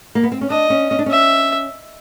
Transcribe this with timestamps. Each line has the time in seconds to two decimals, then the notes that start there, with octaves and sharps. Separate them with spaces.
0.15 A#3
0.23 B3
0.32 C4
0.41 C#4
0.50 D4 D#5
0.70 C#4
0.91 C#4
0.99 D4
1.06 C#4 E5